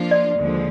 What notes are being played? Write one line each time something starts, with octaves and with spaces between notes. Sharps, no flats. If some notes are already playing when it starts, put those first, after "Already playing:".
Already playing: F3 A#3 D4 F4
D5
D#2 D3 F3 G#3